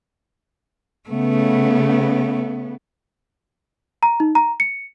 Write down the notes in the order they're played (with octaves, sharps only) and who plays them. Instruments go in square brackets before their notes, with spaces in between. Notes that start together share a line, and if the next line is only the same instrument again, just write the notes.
[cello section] C#3 B3 [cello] A3
[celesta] A#5
D#4
A#5
C#7